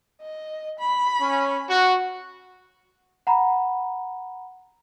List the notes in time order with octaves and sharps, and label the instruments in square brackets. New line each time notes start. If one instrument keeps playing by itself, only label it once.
[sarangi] D#5
B5
[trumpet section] C#4
F#4
[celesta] F#5 A#5 B5